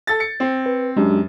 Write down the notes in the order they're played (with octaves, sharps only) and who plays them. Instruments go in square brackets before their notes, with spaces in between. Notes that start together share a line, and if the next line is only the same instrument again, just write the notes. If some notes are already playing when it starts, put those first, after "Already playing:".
[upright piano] A4 A6
C#7
C4
[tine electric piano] B4
[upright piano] F#2 [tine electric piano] G#3 D4 G4